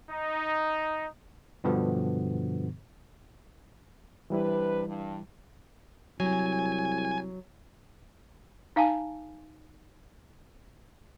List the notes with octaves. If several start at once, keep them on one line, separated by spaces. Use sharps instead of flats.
D#4
G2 B2 D3 F3 B3
C3 E3 G3 D4 E4 B4
G2
C2 F#3 G#5
D#4 F5 G#5 A5